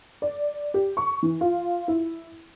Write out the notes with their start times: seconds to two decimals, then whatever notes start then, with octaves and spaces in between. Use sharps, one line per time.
0.22 D5
0.74 G4
0.97 C#6
1.23 E3
1.41 F4
1.88 E4